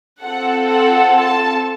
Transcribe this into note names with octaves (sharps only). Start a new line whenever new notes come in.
C4 F4 A4 F#5
F#5
A5